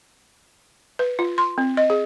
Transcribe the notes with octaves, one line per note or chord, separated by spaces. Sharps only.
B4
F4
C6
C4
D#5
G#4